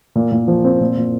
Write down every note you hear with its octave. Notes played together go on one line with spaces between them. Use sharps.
A#2
A#2
F3
C4
A#2
A#2